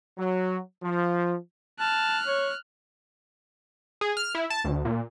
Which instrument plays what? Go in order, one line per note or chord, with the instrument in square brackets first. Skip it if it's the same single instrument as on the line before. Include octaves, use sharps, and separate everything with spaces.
[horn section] F#3
F3
[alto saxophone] A5 [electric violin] F6 F#6
[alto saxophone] C#5
[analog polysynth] G#4
F6
E4
A5
D2
A#2